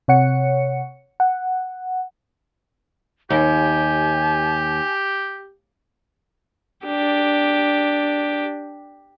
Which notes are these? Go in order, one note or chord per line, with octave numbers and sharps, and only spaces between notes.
C3 C#5 F#5 C#7
F#5
D#2 G4 G#5
D4 G4